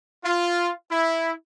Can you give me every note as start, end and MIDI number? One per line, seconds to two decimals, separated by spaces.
0.24 0.71 65
0.91 1.31 64